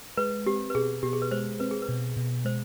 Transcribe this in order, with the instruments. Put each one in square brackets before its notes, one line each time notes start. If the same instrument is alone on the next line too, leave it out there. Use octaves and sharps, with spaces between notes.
[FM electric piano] G#3 [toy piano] B4
[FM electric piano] C4 [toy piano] G4
[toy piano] B4
[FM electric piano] B2 [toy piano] G#4
[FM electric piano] B2 [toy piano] G4
[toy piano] G#4
B4
[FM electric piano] G#3 [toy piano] C5
[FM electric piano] C4 [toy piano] B4
[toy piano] G#4
B4
[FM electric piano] B2
B2
[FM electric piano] G#3 [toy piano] C5